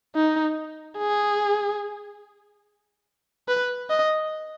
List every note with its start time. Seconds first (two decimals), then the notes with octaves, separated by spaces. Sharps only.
0.15 D#4
0.98 G#4
3.48 B4
3.90 D#5